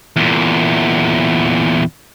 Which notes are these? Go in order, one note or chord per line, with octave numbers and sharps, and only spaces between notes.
E2 A#2